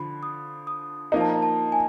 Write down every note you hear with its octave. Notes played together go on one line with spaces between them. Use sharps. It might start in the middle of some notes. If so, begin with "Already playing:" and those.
Already playing: D3 F3 B5
D#6
D#6
F3 A#3 D#4 A#5
A5
A#5
A5
G#5